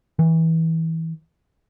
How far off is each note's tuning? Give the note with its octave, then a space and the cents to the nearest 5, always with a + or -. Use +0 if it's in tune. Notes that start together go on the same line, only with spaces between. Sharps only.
E3 -25